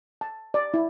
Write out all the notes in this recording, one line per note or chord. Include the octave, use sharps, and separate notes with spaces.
A5
D5
E4